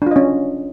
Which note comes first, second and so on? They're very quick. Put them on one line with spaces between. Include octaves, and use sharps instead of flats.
D4 F4 D#5 C#4